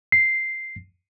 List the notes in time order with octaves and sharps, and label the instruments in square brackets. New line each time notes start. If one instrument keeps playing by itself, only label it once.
[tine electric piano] C7